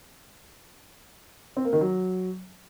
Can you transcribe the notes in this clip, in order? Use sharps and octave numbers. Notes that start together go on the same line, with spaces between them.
C4
A#3
D#3
F#3